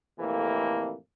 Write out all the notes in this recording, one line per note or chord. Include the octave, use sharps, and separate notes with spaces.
F2 A2 C3 E3 A#3